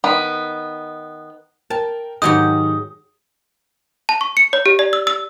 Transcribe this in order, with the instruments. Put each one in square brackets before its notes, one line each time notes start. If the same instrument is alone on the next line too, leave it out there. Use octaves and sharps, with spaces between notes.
[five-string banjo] D#3 B3
[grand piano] A#4 G5 [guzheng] A5
[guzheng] G#2 F#3 G4 [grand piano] D#3 D#4 [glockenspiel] D#6
[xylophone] A5
C#6
C#7
C#5
G4
D5
E6
E6